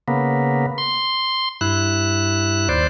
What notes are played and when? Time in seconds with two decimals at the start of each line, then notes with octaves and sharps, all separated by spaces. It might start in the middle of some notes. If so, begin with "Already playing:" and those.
0.08 C#3 A#3 B3
0.78 C6
1.61 G2 E4 F#6
2.69 D#2 C5 D5